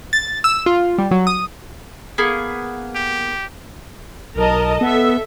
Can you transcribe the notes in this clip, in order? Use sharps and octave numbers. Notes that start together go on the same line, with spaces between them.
A6
E6
F4
G3
F#3
D#6
A#3 B3 G#4
G4
B1 A#4 D#5 A5
B3 A4 E5